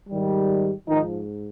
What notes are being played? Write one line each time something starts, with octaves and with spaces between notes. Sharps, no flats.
G#2 D#3 G3
G#2 D#3 F3 D#4